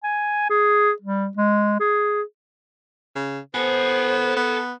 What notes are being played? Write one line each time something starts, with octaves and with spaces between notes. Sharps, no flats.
G#5
G#4
G3
G#3
G#4
C#3
B3 A4 C5 G#5
B3